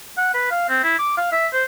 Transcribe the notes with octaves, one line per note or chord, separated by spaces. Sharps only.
F#5
B4
F5
C4
E4
D6
F5
E5
C5